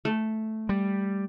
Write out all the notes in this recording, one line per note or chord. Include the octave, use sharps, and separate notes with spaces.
A3
G3